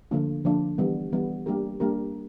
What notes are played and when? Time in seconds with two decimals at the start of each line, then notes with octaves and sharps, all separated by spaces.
0.11 D3 F3 A#3 D4 F4
0.44 D3 F3 A#3 D4 F4
0.78 E3 G3 B3
1.12 E3 G3 B3
1.46 G3 A#3 D4 G4 A#4
1.80 G3 A#3 D4 G4 A#4